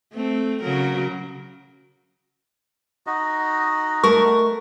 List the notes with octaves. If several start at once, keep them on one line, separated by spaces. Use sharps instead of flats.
A3 C4
C#3 F#3 A#4
D#4 F#4 D#5
A3 A#4 C#6